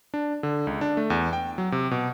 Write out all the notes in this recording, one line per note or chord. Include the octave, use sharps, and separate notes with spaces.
D4
D3
C#2
D4
A3
E2
G5
F#3
C3
B2